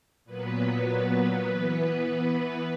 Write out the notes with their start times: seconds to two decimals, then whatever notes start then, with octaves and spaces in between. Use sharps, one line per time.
0.25 A#2 F#3 B3 B4
1.46 E3 B3